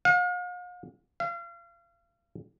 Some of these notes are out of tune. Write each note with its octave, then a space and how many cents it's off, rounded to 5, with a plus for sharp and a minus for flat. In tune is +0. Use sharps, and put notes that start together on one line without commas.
F5 +45
F5 -35